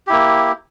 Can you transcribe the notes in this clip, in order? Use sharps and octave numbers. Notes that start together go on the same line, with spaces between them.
A#3 E4 G4